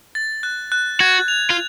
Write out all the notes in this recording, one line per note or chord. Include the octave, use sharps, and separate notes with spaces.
A6
F#6
F#6
F#4 G#6
F7
F4